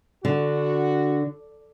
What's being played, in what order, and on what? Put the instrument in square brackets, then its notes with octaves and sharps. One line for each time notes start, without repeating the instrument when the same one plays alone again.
[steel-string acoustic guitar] D3 [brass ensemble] F#4